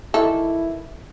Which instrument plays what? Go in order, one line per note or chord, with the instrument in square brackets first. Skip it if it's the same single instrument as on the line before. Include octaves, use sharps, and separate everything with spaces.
[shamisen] D#3 E3 A4 [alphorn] E4